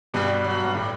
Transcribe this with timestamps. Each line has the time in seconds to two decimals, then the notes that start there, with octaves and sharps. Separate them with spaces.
0.14 G2 B2 G3
0.44 F#3
0.64 G2
0.74 A2 G3